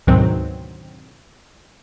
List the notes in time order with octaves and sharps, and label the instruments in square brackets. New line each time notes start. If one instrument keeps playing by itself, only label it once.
[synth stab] D2 G#2 B2 D#3 F#3 C4